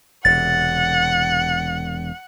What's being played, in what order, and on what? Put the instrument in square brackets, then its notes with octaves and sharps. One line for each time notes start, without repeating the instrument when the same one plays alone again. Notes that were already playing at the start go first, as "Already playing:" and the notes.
[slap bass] E1 C3 [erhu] F#5 [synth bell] A6